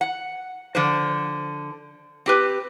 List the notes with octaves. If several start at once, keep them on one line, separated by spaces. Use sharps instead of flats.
F#5
D3 F3 C5
C4 G4 B4